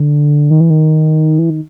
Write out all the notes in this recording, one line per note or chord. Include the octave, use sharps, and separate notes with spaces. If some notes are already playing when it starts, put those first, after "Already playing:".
Already playing: D3
D#3
E3
D#3
E3
D#3